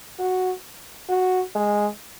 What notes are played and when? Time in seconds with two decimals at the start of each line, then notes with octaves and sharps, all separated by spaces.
0.19 F#4
1.09 F#4
1.55 G#3